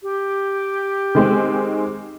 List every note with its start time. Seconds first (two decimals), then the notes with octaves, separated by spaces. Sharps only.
0.03 G4
1.15 D#3 G#3 C4